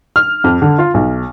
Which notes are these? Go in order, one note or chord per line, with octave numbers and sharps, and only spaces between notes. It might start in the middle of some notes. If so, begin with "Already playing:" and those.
F6
F2
D3
F4
B1